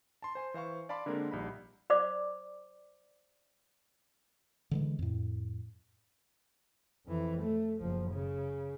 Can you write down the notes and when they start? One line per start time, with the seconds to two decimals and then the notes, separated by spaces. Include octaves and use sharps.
0.22 A5 C6
0.35 C5 G#5 C6
0.54 E3 C5 F5 C#6
0.89 D5 F5 A5 B5 C6 D6
1.06 D3 G#3 A#3 C4 D4 A#4
1.31 A#1 G3 D#4 B5
1.90 C5 D5 D6
4.71 D3 E3 G#3
4.99 F2 A2
7.06 F2 E3
7.41 A3
7.81 F#1 F3
8.11 C#3